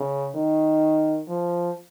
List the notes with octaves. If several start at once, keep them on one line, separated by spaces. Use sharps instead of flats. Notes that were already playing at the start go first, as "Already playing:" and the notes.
Already playing: C#3
D#3
F3